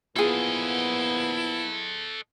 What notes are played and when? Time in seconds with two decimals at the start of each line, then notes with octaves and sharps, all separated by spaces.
0.16 A#2 F3 B3 E4 F4 G#4 A4 D#5